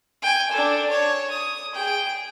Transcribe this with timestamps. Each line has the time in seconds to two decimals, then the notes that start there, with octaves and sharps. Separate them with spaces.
0.22 G5 G#5
0.51 D4 A4
0.89 C#5
1.30 D#6
1.74 G#4 G5